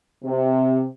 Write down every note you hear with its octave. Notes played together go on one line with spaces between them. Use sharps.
C3